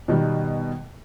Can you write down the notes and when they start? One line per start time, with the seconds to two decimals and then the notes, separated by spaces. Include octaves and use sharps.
0.08 B2 D#3 G3